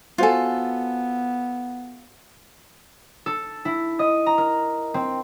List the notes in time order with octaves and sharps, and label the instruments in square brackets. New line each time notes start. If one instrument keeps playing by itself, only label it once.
[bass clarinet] B3 [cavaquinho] F4 A4 [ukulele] F#4 C5 G#5
[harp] A4
E4
D#5
A#5
A#4
C4